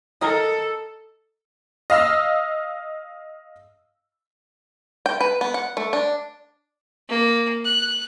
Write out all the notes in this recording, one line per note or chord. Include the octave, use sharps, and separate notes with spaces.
A4 A#4 D#5
D#5 F5 E6
G5
B4
B3
F#5
A3
D4
A#3
F#6